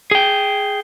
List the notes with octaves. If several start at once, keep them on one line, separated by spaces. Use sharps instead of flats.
G#4 G5